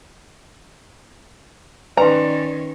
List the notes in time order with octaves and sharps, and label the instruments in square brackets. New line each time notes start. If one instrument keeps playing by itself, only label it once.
[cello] D#3 C#4 [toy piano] B4 G#5 C6 [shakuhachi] D5 [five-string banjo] A#5